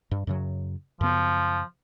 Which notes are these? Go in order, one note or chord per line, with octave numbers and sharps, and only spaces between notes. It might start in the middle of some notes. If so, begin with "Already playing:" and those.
G2
F#2 C#3 F#3
F#2 C#3 F3 B3